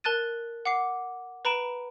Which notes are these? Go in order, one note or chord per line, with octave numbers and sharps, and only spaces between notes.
A#4 A5 F#6 A6 D#7
F#5 D6 C7
B4 A#5 B5 D7 E7